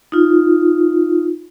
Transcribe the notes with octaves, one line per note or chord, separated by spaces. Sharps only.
D#4 F4